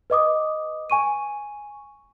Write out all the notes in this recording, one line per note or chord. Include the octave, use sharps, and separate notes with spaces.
B4 D#5 D6 D#6
G#5 C#6 D#7